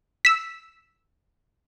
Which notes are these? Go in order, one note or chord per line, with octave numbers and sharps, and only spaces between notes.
E6 B6